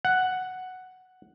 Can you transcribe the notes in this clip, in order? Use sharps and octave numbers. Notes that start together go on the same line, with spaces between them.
F#5